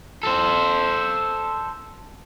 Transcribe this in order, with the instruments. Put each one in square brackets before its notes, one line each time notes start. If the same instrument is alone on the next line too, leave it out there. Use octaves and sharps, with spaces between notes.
[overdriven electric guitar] A4 C5